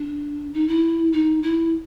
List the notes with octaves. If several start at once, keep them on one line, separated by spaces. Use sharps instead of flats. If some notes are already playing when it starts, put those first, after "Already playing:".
Already playing: D4
D#4
E4
D#4
E4